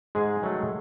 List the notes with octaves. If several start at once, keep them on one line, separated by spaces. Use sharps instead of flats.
G#2 G#3 G#4
D#3 F#3 A3